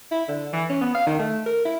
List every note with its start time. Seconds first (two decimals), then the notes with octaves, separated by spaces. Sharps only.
0.11 E4
0.28 D3
0.53 E3
0.70 C#4
0.81 B3
0.95 F5
1.06 D#3
1.19 A3
1.46 A#4
1.65 E4